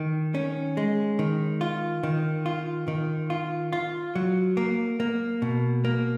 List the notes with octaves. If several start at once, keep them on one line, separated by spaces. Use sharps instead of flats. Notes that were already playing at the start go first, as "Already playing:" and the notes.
Already playing: D#3
C#4
G#3
D#3
F4
D#3
F4
D#3
F4
F4
F#3
A#3
A#3
B2
A#3